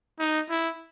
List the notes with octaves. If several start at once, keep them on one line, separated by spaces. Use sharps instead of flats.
D#4
E4